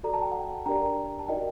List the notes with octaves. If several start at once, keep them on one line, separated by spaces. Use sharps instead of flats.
F#4 A4 D5 A#5
A5
G5
F#5 A5
D4 G4 A#4 D5 G5 A#5
A5
D#4 F#4 A#4 D5 D#5 G5